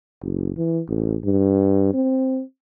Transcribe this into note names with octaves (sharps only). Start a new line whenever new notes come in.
F#1
E3
A1
G2
C4